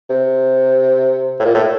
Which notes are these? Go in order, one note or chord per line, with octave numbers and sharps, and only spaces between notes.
C3
A2
A#2
A2